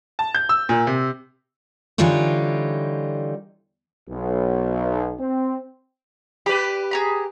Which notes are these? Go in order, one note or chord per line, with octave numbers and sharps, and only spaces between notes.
A5
G6
E6
A#2
C3
D3 E3 G3 D#4 F4 C#5
B1
C4
G4 B4 D5 B5
G#4 A#5 B5